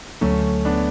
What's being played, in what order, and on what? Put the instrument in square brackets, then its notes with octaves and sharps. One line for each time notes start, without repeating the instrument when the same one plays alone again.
[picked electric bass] D2 D3 F#3 [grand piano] A3 C#4
[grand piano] B3 D4